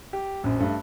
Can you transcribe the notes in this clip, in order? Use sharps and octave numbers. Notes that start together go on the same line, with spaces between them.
G4
A#1 F#2
G2 A3